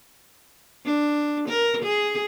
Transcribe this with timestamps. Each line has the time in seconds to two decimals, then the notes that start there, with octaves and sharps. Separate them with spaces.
0.85 D4
1.49 A#4
1.83 G#4